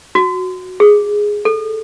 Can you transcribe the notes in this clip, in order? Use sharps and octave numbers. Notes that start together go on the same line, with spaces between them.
F#4
G#4
A4